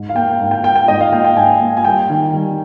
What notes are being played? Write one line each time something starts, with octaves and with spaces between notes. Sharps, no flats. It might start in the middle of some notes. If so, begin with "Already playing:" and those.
Already playing: G#2
F5
A#3 G5
G#2
G5
A#3 G5
G5
G#2 D#5
F5
A#3 G5
G5
G#2 G#5
A#3
G#5
G3 G5
D#3
G3